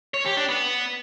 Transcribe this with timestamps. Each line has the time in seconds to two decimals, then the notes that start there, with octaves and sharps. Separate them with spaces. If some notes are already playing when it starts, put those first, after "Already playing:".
0.14 C#5
0.25 G4
0.37 D4
0.49 B3